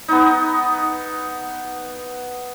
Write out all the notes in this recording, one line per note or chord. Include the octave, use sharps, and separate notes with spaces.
B3 D#4